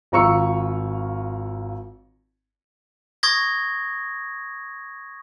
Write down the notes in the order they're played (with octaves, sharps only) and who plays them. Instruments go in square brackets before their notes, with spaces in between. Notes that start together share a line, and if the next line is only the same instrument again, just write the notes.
[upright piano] G#1 F4 A#5 C#6 E6 C#7
[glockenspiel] C#6 D#6 G#6 A#6